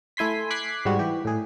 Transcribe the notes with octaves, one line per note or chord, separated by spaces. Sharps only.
A3 E4 G#5 C6 B6
D6 F#6 G#6 B6 C7
G#2 G3 F#4
E3 G4
A2 G#4